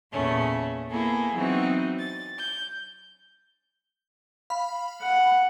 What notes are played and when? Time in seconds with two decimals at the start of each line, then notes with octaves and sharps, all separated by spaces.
0.12 E2 A#2 C#3 A3 C#4
0.89 A#3 B3 E4 G#4 A4
1.34 E3 F#3 B3 C4 D#4 F#4
1.99 A6
2.38 G6
4.50 F5 B5
5.02 F#5